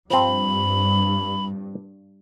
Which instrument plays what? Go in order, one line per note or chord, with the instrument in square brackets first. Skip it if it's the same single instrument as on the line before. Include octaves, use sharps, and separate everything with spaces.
[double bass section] G2 [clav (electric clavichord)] F3 C4 [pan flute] B5